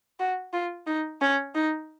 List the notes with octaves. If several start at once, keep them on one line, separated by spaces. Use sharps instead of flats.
F#4
F4
D#4
C#4
D#4